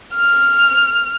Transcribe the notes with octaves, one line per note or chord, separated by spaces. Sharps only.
F6